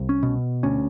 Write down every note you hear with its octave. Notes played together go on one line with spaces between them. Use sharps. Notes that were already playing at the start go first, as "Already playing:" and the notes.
Already playing: C2
C#4
B2
D2 C#4